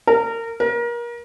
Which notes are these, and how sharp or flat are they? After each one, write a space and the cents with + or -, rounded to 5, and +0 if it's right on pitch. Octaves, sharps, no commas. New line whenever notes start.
A#4 -25
A#4 +30